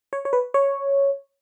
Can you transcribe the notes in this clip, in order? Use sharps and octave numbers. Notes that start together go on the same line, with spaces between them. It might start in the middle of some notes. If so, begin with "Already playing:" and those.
C#5
C#5
B4
C#5